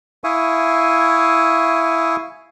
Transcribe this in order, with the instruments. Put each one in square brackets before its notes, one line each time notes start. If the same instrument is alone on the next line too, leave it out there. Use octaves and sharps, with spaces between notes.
[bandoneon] E4 E5 F5 G#5 C#6 D#6